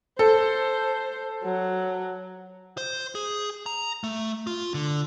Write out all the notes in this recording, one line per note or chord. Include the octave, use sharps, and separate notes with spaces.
A4 C5
F#3
C5
G#4
A#5
A3
F4
D3